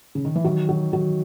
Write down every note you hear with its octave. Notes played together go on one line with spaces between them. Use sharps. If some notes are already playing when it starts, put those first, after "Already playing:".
C#3
D#3
E3
D#3 F#3
D#3 F#3
D#3 F#3